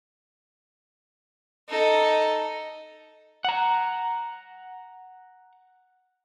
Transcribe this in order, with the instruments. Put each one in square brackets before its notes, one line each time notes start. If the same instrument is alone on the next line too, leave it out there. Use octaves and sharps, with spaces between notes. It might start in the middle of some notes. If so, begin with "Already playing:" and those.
[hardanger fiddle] D#4 A4
[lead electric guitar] F#5 A#5